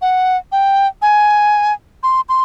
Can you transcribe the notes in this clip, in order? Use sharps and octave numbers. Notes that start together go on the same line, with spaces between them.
F#5
G5
G#5
C6
C6